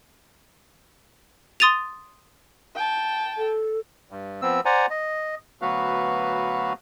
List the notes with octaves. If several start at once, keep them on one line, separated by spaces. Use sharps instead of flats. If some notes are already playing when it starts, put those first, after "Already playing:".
C6 D#6 A6 D#7 F7
G5 A5
A4
G2
F3 B3 C4 E6
C5 D5 F#5 G#5 A#5
D#5
D2 F#3 B3 F#4 B4 F5